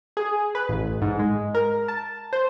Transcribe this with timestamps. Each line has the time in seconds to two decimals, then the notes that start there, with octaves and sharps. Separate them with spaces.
0.17 G#4
0.55 B4
0.69 A1
1.02 G#2
1.19 G#3
1.55 A#4
1.88 A5
2.33 C5